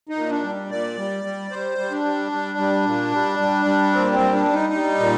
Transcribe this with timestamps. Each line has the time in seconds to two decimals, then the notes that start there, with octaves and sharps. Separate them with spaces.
0.09 D#4
0.16 A#2
0.30 D4
0.44 G3
0.70 A#2 D5
0.97 G3
1.24 G3
1.51 G3 C5
1.78 G3
1.91 D4
2.04 G3
2.32 G3
2.58 G3
2.85 A#2
3.12 G3
3.39 G3
3.65 G3
3.93 A#2 C4
4.12 C4
4.19 G3
4.33 D4
4.46 G3
4.53 D#4
4.73 G3
4.99 A#2